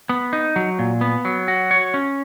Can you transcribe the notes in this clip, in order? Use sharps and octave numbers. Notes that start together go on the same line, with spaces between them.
B3
D#4
F#3
A#2
B3
F#3
F#4
C#5
C#4